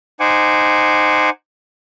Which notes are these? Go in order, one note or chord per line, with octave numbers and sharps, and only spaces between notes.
D#4 C5 F#5 G#5 D6